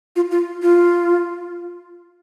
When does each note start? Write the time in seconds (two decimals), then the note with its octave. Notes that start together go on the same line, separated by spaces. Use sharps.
0.16 F4
0.31 F4
0.62 F4